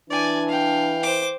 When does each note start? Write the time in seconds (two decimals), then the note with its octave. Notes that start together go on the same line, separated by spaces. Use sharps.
0.10 E3 D4 D5 G#5
0.49 F5 G5
1.03 C5 D6